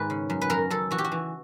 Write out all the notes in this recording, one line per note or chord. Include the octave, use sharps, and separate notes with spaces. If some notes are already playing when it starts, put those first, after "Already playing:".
Already playing: G#2 D#3 B4
C#3
F#2
B4
F#2 A#4
F#2 A4
E3 F#4
G4
F#4
E3